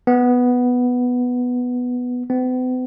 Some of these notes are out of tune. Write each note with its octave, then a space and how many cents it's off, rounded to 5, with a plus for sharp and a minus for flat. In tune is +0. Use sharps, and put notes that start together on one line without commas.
B3 +0
B3 +45